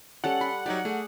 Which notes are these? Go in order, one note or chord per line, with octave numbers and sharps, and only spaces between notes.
G3 C#4 A4 F#5
B5 C6
F#3 D#4 G4 D5
A3 G#4